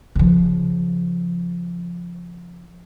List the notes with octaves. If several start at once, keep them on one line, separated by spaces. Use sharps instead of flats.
C#3 F3